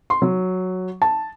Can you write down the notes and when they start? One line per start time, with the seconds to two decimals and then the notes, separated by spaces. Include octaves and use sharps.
0.10 C6
0.22 F#3
1.02 A5